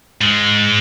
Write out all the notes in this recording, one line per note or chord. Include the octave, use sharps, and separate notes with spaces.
G#2 G#3